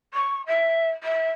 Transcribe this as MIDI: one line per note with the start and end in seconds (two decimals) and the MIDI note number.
0.14 0.42 85
0.46 0.90 76
1.03 1.29 76